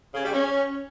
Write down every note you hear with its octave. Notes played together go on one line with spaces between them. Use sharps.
C#3
G3
C#4